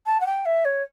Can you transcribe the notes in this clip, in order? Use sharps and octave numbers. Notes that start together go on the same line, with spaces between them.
A5
F#5
G5
E5
C#5